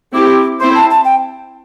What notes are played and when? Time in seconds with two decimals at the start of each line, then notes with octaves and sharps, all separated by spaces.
0.13 C4 E4 G4 D6
0.60 C4 E4 C5 C6
0.74 A5
0.90 A5
1.04 G5